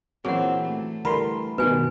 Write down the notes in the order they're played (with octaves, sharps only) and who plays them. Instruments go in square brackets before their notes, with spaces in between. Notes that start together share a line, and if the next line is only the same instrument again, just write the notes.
[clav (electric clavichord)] A#2 F#3 C#4 [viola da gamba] E3 C4 [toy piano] G#4 F#5
[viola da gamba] A3
[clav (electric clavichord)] D3 E3 G3 [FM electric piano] A#4 C6 [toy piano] B5
[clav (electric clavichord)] G2 [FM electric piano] B2 D#3 [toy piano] B4 G#5